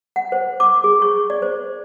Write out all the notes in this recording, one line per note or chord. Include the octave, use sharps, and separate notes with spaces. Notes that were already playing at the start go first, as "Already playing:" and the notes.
F#5
C5
D6
G#4
C#6
D5
C5